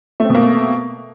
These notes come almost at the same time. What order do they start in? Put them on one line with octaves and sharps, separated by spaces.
A3 C4 B2 A#3